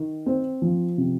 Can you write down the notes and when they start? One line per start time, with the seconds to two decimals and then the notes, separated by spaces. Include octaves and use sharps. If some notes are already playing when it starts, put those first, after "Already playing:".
Already playing: D#3
0.26 C4
0.62 F3
0.98 C3